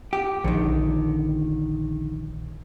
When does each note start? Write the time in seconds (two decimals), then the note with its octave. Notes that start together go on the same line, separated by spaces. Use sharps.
0.13 G4
0.44 A#1 D3 D#3